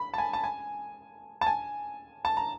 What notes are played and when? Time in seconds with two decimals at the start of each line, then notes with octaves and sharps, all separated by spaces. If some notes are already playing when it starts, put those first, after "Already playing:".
Already playing: B5
0.14 A5
0.18 G#5
0.33 A5
0.44 G#5
1.41 A5
1.47 G#5
2.25 A5
2.37 A#5